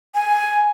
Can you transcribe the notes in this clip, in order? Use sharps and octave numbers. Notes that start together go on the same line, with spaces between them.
G#5